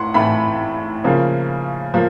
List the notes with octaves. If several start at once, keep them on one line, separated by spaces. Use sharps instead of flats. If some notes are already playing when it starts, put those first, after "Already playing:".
Already playing: A2 F#5 C6
A2 E3 A3 B5
C#3 F3 A#3
F3 A#3